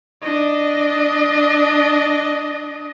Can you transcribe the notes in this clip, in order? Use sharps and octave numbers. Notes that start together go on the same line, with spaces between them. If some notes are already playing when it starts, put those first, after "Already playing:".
D4 D#5